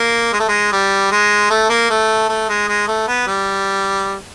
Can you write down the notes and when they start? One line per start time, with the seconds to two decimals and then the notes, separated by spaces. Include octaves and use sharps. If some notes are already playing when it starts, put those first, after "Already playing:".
Already playing: A#3
0.33 G#3
0.40 A3
0.48 G#3
0.72 G3
1.12 G#3
1.50 A3
1.69 A#3
1.90 A3
2.28 A3
2.49 G#3
2.68 G#3
2.88 A3
3.08 B3
3.27 G3